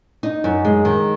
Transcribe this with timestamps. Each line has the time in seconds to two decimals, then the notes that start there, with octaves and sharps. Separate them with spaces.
0.23 D#4
0.44 F#2
0.65 G#3
0.85 D#3